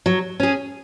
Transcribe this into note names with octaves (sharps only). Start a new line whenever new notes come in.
F#3
C#4 G#4